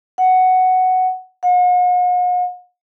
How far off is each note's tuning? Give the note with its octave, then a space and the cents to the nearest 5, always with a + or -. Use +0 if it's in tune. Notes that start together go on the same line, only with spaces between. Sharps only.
F#5 +5
F#5 -45